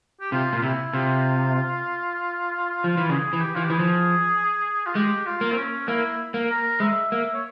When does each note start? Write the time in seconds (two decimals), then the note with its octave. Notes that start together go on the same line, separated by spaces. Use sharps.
0.20 G4
0.32 C3 F4
0.53 A#2
0.57 F4
0.62 C3 E4
0.93 C3 F4
2.84 F3
2.97 E3
3.09 C#3 G#4
3.33 E3
3.41 G4
3.55 E3 F4
3.63 G4
3.70 E3 G#4
3.79 F3
4.86 F4
4.95 G#3 G4
5.26 F4
5.41 A#3
5.52 C4
5.57 C#4
5.87 A#3 E4
6.34 A#3
6.50 A#4
6.80 G#3 E5
7.11 A#3 E5
7.34 C#5